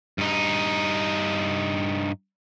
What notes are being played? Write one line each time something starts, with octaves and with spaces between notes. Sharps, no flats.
G2 D#4